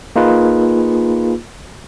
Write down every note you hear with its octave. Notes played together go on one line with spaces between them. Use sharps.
A#3 D#4 F4 G#4 B4